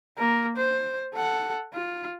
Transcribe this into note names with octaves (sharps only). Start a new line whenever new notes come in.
A#3 A#4
C5
A4 F#5
F4